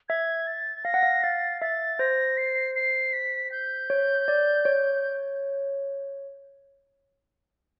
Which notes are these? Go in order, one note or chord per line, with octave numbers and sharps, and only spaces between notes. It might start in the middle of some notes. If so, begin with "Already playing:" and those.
E5 G#6
A6
F5 A#6
F#5
F5
F5 A6
E5 A6
C5 A#6
C7
C7
B6
G6
C#5
D5
C#5